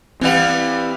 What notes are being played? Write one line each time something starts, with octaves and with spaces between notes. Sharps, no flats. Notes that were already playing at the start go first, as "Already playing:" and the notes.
E3 G3 B3 C4 E4 F5